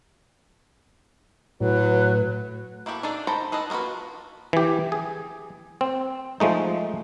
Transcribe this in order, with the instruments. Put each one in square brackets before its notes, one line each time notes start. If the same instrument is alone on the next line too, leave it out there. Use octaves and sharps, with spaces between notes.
[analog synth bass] A2 [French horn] F#3 [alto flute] B4
[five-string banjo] A#3 E4 F#4 G4 A4
D4 D#4 G#4 A4 D5
D#3 A4 C5 A#5 B5
G#4 A4 B4 D#5
A#3 B3 F4 F#4 B4
[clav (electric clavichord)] E3 G4
G#4
C4
F3 G#3 A3 D#4